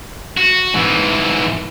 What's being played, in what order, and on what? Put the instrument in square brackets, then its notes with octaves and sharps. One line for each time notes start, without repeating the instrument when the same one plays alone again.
[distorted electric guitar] F#4
G#2 E3